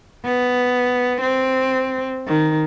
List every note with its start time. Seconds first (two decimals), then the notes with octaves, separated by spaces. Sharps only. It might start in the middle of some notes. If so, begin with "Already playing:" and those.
0.25 B3
1.21 C4
2.27 D#3